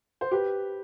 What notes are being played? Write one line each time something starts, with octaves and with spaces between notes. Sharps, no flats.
C5
G4 B4